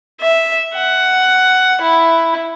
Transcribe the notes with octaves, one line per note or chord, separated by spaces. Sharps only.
E5
F#5
E4